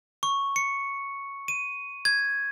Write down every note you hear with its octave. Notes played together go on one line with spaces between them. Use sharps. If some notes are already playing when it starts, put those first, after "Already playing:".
C#6
C#7
D#7
G#6